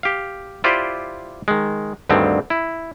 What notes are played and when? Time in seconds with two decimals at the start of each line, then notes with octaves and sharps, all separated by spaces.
0.03 G4 F5
0.64 E4 F4 G4 C5 D5
1.48 D#3 G#3
2.09 D2 G2 D3 D#3 C4
2.50 E4